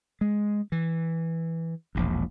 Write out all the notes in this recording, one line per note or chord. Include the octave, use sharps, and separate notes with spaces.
G#3
E3
E1 A#1 E2